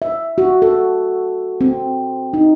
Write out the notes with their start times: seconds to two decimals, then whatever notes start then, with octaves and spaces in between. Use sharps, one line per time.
0.02 E5
0.38 F#4
0.62 A4
1.61 C4
2.34 D#4